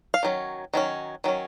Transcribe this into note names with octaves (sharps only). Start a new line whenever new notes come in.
F5
D#3 F#3 C#4
D#3 F#3 C#4
D#3 F#3 C#4